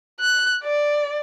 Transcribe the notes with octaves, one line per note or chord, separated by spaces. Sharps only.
F#6
D5